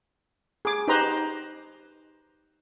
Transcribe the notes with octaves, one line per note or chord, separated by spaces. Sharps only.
G#4 D6
D#4 G4 B4 C5 A#5 C6